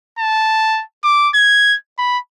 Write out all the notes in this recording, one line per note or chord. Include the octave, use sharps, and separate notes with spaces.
A5
D6
G#6
B5